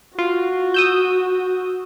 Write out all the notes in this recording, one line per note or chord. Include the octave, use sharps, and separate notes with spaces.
F4 F#4
D#6 E6 G6